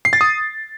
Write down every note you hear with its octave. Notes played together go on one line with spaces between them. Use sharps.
C7
A6
D#6